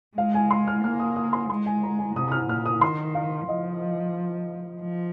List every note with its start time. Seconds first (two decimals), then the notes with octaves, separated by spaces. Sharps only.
0.17 G#3 F5
0.34 G#5
0.51 C6
0.68 F6
0.84 A#3 F6
0.99 D#6
1.16 D#6
1.33 C6
1.50 G#3 C6
1.66 G#5
1.83 A#5
1.99 G#5
2.16 C3 D#6
2.28 D#6
2.32 F6
2.49 A#2 F6
2.66 D#6
2.81 D#3 C6
3.15 F5
3.47 F3 D#5
4.81 F3